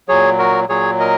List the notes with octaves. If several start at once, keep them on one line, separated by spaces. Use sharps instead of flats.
A#2 F#3 G#4 C#5
F#4 A#4
A#2 F#3 G#4 C#5
A#4 D#5